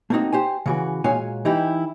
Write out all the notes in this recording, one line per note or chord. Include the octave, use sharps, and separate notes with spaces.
A3 A#3 C4 D4 D#4 F#4
G4 C5 G#5
C#3 E3 F#4
A#2 G#3 F#4 C#5 F5 G#5
E3 D#4 E4 G4